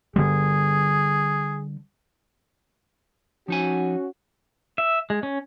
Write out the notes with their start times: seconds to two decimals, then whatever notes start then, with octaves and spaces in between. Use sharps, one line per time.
0.16 D3 G3 G#4
3.48 F3 C#4 D#4 F#4 G#5
4.78 E5
5.10 G#3
5.23 C#4